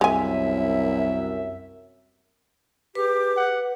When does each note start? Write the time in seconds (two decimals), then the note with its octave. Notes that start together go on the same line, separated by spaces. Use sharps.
0.01 C2 F#2 G#3 E5 G#5
2.95 G4 G#4 B4 D6
3.37 F#5